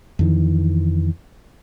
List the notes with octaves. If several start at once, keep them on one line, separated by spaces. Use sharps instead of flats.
F2 D#3 E3